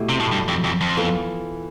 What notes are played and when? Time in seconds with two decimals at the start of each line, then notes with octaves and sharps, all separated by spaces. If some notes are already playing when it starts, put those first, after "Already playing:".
Already playing: B2 A3 E4 G4
0.09 C3
0.20 A2
0.32 G2
0.48 F2
0.64 F2
0.81 F2
0.97 E3 B3 F4 A4